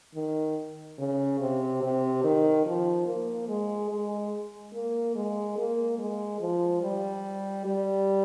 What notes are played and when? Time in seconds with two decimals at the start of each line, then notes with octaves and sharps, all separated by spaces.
0.14 D#3
0.98 C#3
1.40 C3
1.82 C3
2.23 D#3
2.65 F3
3.07 A#3
3.48 G#3
3.90 G#3
4.73 A#3
5.15 G#3
5.57 A#3
5.98 G#3
6.41 F3
6.82 G3
7.66 G3